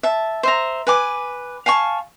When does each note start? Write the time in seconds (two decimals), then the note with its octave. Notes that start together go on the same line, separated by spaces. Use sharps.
0.03 E5 A5
0.43 C5 E5 A#5
0.87 B4 G#5 D6
1.66 F5 G#5 A5 C#6